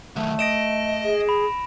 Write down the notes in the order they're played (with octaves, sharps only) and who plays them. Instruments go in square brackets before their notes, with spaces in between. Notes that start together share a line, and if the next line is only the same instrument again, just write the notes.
[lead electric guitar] D#3 F#3 [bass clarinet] A3
[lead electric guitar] D#5 [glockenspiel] A#6 D7 E7
[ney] G#4
[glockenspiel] B5